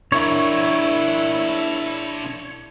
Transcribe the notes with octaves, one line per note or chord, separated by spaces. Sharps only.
D4 E4 A#4 C#5